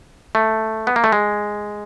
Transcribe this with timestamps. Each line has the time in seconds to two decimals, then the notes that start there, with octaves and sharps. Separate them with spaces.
0.35 A3
0.87 B3
0.96 A#3
1.04 A3
1.12 G#3